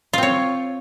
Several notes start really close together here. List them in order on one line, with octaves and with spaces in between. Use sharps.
F4 C4 C#5